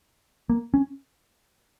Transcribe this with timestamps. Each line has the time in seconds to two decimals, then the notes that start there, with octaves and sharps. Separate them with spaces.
0.50 A#3
0.74 C#4